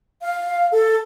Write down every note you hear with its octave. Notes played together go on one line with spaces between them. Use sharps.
F5
A4